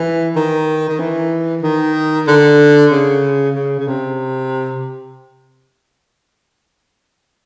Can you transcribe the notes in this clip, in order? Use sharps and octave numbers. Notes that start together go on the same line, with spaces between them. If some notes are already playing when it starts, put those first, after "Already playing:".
Already playing: E3
D#3
D#3
E3
D#3
D3
C#3
C#3
C#3
C3